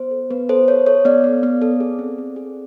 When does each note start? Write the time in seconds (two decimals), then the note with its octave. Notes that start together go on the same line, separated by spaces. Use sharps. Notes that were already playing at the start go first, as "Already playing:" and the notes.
Already playing: B3 C5
0.11 A4
0.30 B3 B4
0.49 A4 C5
0.68 A4 C#5
0.86 A4 C#5
1.05 B3 D5
1.24 B3
1.43 B3
1.62 A4
1.80 G#4
1.99 C4
2.18 C4
2.36 G#4